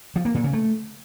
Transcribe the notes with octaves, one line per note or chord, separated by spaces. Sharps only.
F3
A#3
A#2
C#3
A3